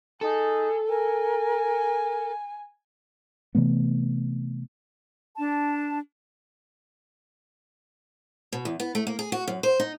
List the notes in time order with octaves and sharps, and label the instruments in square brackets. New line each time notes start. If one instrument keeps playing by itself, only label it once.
[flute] D#4 [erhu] G#4 [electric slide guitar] A4
[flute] A#4 [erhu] G#5
[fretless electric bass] C3 E3 A3 B3
[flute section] D4 A5
[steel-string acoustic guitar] B2
E2
B3
A3
A#3
G#4
F#4
F#2
C5
D#4